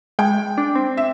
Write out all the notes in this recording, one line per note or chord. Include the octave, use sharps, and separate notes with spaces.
G#3 G5
D4
C4
E5